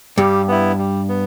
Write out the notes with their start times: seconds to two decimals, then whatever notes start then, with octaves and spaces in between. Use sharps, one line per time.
0.18 G2 G3
0.48 B3 E4
0.79 G3
1.09 B3